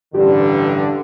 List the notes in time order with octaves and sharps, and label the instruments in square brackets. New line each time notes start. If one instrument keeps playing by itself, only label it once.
[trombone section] A1 G2 D3 [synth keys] G4